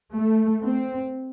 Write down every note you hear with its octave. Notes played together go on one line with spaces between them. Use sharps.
A3
C4